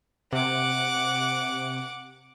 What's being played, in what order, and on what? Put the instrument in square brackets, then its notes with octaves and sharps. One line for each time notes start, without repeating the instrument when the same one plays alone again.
[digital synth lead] C3 [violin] F#5 D6